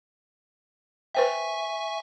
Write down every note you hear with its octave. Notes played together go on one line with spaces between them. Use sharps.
B4 C5 E5 G5 G#5 C#6